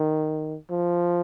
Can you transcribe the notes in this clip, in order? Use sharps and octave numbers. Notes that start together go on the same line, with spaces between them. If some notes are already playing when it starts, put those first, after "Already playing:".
Already playing: D#3
F3